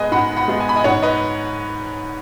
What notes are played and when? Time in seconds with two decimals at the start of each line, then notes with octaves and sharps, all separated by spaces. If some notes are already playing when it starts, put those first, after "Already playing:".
Already playing: G#2 G#3 B3 D#4 B4 D#5 G#5
0.12 G#2 F#5 B5
0.36 F#5 B5
0.48 G#3 B3 D#4
0.60 G#5
0.69 B5
0.76 D#5 G#5
0.84 G#2 C#5 F#5
1.02 B4 D#5